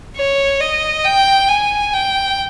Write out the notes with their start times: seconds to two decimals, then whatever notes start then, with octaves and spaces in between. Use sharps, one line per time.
0.16 C#5
0.60 D#5
1.04 G5
1.48 G#5
1.93 G5